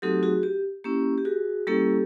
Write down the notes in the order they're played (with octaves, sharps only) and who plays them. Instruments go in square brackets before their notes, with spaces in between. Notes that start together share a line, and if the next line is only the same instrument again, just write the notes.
[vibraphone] F#3 A3 C4 D#4 F#4 G4 A4
F#4 G#4
G4
A#3 C#4 E4 G4
G4
F#4 G#4
G3 A#3 C#4 E4 G4 A4